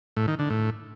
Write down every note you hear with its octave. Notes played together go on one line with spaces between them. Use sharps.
A2
D#3
D3
A2